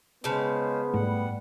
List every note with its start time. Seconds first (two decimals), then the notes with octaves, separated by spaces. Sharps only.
0.24 C#3 G#3 B3 C#4 C5 A5
0.94 G#2 G3 A3 F#5